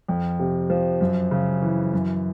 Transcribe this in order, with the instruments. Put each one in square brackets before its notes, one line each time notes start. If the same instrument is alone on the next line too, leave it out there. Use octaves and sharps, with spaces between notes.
[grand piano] F2
C3
F3
F#2
C#3
E3
F#2